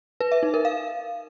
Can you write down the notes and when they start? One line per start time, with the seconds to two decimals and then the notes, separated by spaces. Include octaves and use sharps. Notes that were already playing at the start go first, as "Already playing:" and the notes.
0.21 B4
0.32 E5
0.43 D#4
0.54 A#4
0.65 F5